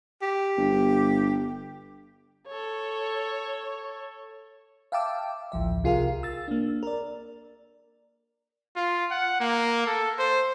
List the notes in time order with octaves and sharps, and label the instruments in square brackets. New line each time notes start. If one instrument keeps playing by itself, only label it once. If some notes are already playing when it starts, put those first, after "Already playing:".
[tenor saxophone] G4
[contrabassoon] G1
[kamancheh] A4 C#5
[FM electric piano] E5 F5 G5 A5 D6 E6
A1 D2 F3 E5
C2 C3 F4 G#4 A#4 F5
E6 A6
A#3 D4
A#4 D5
[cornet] F4
F#5
A#3
A4
C5